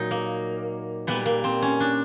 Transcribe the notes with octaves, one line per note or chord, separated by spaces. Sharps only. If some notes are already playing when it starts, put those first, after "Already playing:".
Already playing: A#2 F#3 D#4
A#3
A#2 G3 A#3 B3
A#3
C4
C#4
D4